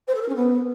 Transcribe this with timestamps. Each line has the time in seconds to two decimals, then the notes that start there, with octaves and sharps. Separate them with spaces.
0.07 C5
0.14 A4
0.21 A#4
0.28 C#4
0.35 B3